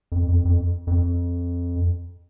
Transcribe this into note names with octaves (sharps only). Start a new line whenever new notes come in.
F2
F2
F2
F2